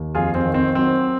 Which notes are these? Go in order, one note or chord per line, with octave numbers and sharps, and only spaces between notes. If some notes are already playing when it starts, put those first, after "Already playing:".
Already playing: D#2
F2 F4 G#4
C4
D#3
C4
F#3 C4